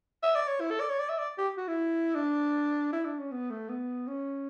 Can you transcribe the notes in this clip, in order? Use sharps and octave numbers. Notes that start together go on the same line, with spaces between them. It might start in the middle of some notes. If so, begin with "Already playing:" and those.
E5
D5
C#5
E4
A4
D5
C#5
D5
E5
D5
G4
F#4
E4
D4
E4
D4
C#4
B3
A3
B3
C#4